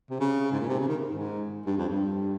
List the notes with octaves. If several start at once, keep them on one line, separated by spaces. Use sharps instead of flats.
C3
C#3
G#2
A#2
C3
C#3
D#3
G#2
G2
F2
G2